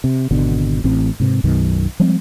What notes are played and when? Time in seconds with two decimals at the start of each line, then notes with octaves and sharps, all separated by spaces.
0.04 C3
0.31 G#1 B2 D3
0.84 A1 A2 C4
1.20 G#2 C3
1.44 B1 F#2 B2 D#3
2.00 F3 G3 G#3 C4